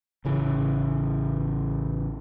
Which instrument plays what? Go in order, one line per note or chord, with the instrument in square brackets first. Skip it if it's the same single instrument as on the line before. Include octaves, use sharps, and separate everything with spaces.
[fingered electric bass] A1 C#3 E3